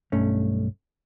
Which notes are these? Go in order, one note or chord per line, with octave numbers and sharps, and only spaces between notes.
B1 G2 A3 C#4